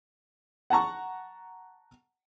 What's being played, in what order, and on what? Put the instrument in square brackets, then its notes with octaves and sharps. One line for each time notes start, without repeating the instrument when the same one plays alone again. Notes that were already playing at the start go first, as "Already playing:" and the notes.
[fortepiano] F#5 A5 A#5 C#6